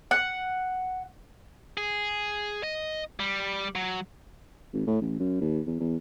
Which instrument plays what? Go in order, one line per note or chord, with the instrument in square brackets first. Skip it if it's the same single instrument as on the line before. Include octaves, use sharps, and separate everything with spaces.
[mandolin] F#5
[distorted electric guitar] G#4
D#5
G3
F#3
[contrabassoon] G#1
A2
A1
F#2
D#2
E2
E2